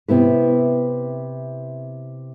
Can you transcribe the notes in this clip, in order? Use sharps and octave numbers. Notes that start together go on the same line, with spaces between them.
C3 B3 E4 B4